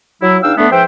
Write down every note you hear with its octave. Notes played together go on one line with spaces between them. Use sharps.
F#3 E4
E2 D4 D#4 F5 G5 E6
A3 B3 D4
G#2 F3 B4 C5 E5 G5